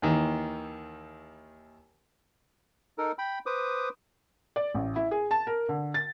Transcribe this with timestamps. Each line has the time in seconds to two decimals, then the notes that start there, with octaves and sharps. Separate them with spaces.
0.02 D#2 D#3 E3
2.98 D#4 A4 A#4
3.18 G5 B5
3.46 B4 C5 D6 D#6
4.56 D5
4.74 A1
4.96 E4
5.11 G#4
5.31 A5
5.47 A#4
5.69 D3
5.94 A6